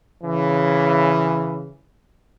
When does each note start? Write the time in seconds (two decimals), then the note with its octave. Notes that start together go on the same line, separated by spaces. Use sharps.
0.24 C#3 E3